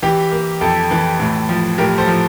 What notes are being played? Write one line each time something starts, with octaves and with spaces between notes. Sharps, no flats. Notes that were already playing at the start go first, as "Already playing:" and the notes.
E3 G4
A#3
F2 A4
E3
A2
F3
A2 G4 A#4
A4 C5
F3